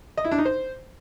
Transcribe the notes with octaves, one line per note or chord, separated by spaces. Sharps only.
D#5
E4
D4
D#4
C5